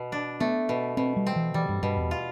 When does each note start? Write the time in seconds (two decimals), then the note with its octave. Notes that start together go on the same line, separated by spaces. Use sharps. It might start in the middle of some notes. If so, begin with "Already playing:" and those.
Already playing: B2
0.12 D4
0.40 A3 B3
0.69 B2
0.97 B2 C4
1.17 G3
1.27 C4
1.36 E3
1.54 E3 G3
1.69 G2
1.83 G2 B2
1.97 E2
2.11 F4